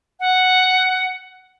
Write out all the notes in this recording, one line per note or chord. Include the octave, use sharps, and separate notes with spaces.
F#5